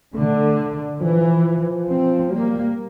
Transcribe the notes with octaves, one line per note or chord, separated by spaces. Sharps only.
D3 A3
E3 F3
C4
G3 A#3